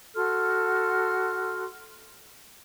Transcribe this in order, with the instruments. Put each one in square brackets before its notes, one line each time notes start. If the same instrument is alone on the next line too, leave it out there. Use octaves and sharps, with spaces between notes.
[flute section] F#4 A4 C6 F6